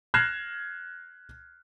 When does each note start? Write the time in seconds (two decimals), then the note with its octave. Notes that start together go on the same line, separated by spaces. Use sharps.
0.14 F6 F#6 G#6 A#6 C7 E7